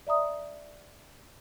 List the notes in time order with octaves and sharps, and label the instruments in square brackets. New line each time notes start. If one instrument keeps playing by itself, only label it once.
[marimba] D5 E5 A#5 D#6